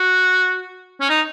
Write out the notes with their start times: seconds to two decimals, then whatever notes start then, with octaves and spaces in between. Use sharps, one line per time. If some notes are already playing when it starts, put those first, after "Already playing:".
Already playing: F#4
1.01 C#4
1.10 D#4